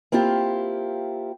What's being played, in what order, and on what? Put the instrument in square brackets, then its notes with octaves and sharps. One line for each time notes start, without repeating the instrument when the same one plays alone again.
[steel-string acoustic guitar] A#3 C4 E4 F4 G4